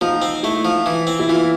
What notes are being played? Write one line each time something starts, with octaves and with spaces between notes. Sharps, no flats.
F3 D#4
C4
A3 E4
F3
E3
C4
E4
E3 F4